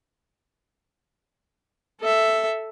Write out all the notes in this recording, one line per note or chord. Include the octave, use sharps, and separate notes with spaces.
A4 E5